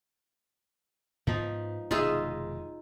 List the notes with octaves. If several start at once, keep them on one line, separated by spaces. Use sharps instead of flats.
G#2 F3 B3 D#4
F1 B2 D#3 G#3 D#4 F4 G#4 E5